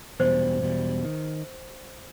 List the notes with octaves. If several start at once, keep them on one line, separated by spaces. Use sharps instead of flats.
E2 B2 G3 C5
E2 B2 G3
D#3